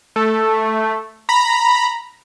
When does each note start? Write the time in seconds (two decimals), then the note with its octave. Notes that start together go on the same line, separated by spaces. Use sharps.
0.16 A3
1.29 A#5 B5